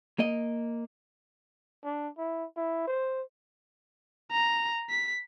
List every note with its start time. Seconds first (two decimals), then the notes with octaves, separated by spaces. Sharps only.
0.19 A#3 D#5
1.84 D4
2.18 E4
2.56 E4
2.88 C5
4.32 A#5
4.90 B6